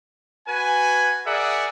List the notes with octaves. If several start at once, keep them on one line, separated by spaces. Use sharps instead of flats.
F#4 B4 G#5
G#4 A#4 D5 E5 F#5